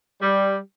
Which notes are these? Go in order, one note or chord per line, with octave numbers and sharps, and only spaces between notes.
G3